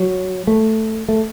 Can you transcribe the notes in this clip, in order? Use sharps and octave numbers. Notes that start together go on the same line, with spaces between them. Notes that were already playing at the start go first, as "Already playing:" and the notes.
Already playing: F#3
A3
A3